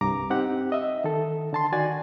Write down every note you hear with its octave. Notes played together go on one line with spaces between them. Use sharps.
C2 G2 A#5 D6
C4 D#4 G4 F#5
D#5 E5
D#3 A4
D3 A5 C6
D#3 F#4 D5 G#5 A6